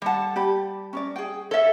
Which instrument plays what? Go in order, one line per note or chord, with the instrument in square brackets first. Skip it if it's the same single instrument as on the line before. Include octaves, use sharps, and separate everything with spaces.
[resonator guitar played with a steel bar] G3 A5 [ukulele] A4 F#5
[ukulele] G4 D5 B5
C#4 A#4 D5
G#4 G5
[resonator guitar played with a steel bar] A4 E5 [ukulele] C#5 F5